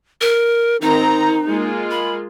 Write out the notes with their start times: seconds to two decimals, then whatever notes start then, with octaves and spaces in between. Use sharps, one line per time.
0.21 A#4
0.82 D#3 C4 D#4 A#5
1.48 G#3 A#3 F4
1.91 B5